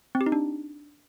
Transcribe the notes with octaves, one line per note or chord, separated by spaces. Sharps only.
C4
G4
D#4
D4